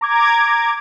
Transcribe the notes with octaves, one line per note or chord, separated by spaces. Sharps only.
A#5 D6 G#6